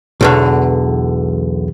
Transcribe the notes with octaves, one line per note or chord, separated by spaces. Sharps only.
B1 E2 D3